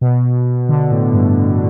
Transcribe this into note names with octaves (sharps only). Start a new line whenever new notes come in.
B2
D3
A2
G2